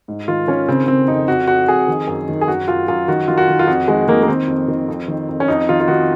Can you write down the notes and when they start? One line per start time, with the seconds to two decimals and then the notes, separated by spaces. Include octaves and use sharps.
0.08 G#2
0.28 D#3 F4
0.47 D#3 C#4
0.68 C#3 C4
0.88 C#3 C4
1.08 F2 D#4
1.28 F2 F#4
1.47 F2 F#4
1.68 F2 G#4
1.88 D#3
2.07 F#2
2.29 D#3
2.41 G#4
2.48 F#2 F#4
2.68 F#2 F4
2.88 F#2 F4
3.08 D#3 F#4
3.28 D#3 F4
3.38 F#4
3.49 D#3
3.59 F4
3.68 F2 F#4
3.88 D#3 G#3
4.08 D#3 A#3
4.23 A#3
4.28 D#3 C4
4.48 F2
4.68 D#3
4.88 F2
5.08 D#3
5.29 F2
5.40 C#4
5.48 F2 D#4
5.69 D#3 F4
5.80 F4
5.88 D#3 F#4